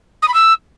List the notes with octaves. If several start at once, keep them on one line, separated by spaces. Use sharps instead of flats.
D#6
B5
E6